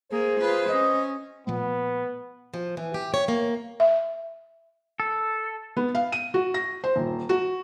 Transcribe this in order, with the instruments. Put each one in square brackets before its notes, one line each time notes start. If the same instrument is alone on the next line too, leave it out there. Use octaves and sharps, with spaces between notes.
[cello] A#3 [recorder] G#4 [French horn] C5
[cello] F4 B4
[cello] C#4 [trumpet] D#5
[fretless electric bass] A#2 F3 A3 [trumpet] B3
[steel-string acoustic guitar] F3
E3
G4
C#5
A#3
[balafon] E5
[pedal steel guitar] A4
[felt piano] B3
F5
D#7
F#4
A#6
C5
D#1
F#4